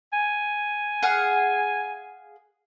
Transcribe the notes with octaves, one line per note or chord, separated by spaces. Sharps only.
G#5
G#4 F5 F#5